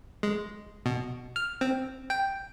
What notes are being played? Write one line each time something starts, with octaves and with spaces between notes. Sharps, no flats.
G#3
B2
F6
C4
G5